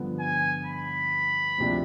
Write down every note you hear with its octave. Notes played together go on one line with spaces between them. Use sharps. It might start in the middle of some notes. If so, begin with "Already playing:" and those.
Already playing: G2 D3 F3 B3
G#5
B5
D2 C3 F3 G#3 D4